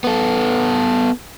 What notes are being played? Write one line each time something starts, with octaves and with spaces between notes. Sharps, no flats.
B3 A4